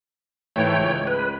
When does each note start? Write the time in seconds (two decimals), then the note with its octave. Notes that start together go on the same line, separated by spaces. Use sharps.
0.56 G#2 E3 A3 C#5 G5
0.79 C#2
1.07 B4